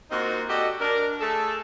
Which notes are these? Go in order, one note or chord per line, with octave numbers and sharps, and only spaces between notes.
A#3 C4 D#4 F4 F#4
F#4 G4 A4 D5 D#5
D4 A#4
A3 G#4 A4